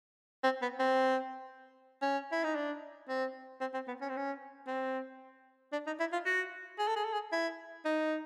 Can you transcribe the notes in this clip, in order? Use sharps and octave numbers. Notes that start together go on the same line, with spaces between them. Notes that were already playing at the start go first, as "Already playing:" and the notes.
C4
B3
C4
C#4
E4
D#4
D4
C4
C4
C4
B3
C#4
C4
C#4
C4
D4
D#4
E4
F4
F#4
G#4
A4
G#4
A4
G#4
E4
D#4